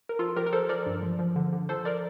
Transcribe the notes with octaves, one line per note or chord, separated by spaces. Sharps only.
A#4
F3 F4 A4
F3 G4 A#4
A#4
F3 A4 C5
F3 A#4 D5
G2
F3
F3
D3
D3
F3 A4 C5
A#4 D5